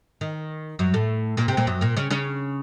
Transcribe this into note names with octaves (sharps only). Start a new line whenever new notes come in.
D#3
F#2 F#3
A2 A3
A#2 A#3
C3 C4
A#2 A#3
F#2 F#3
A#2 A#3
C#3 C#4
C#3 C#4